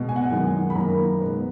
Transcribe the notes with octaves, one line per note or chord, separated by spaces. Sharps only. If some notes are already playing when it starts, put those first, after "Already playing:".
Already playing: B2 G#3 B3
G#5
F#5
G#5
F#2 D#3 G#3
B5
F#2 D#3 A#3 A#5
B2 G#3 B3